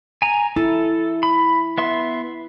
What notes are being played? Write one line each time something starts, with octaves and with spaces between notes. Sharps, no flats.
G#5 A#5
E4 A4
B5
B3 E5 C6